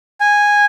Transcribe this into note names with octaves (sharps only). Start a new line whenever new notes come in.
G#5